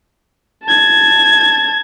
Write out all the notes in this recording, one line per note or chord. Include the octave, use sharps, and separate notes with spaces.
A5 G#6